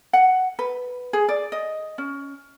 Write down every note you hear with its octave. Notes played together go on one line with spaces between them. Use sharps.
F#5
B4
G#4
D5
D#5
C#4